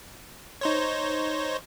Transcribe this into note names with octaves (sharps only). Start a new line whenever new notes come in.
D#4 C5 C#5